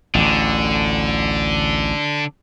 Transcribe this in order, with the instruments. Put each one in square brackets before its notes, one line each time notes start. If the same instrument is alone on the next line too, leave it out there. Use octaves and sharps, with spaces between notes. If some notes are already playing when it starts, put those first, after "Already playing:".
[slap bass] A1 D2 [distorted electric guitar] D3